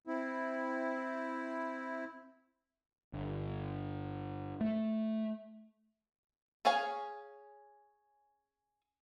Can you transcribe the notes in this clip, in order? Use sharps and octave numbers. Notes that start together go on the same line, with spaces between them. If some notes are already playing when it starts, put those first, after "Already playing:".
C4 E4
G1
A3
C#4 G#4 C#5 F5 G#5